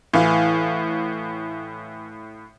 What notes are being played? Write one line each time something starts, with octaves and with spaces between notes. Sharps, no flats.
A2 E3 F5